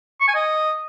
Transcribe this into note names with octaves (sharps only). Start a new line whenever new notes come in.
C#6
G#5
D#5